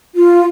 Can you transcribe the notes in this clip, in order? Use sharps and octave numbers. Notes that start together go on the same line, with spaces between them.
F4